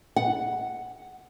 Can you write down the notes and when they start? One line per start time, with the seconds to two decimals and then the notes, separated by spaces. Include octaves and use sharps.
0.16 F#5